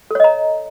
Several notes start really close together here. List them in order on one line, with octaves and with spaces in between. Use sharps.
A4 C#5 D#5 A#5